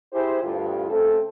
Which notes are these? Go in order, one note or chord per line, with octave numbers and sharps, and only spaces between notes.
E4 G4 G#4 C5
D2 G2 F4
C#3 A3 C4 A4